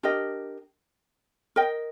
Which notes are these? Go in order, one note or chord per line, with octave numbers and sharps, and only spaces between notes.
D4 G4 A#4 D#5
A#4 D#5 G5